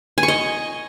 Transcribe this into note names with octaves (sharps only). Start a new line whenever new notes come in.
G#5
C#6
D#5